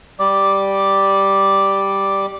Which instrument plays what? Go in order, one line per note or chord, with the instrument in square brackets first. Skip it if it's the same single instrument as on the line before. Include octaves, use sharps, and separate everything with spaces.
[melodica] G3 D5 D6